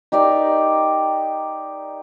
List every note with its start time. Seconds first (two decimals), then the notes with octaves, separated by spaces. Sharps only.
0.12 D#4 G4 A#4 D5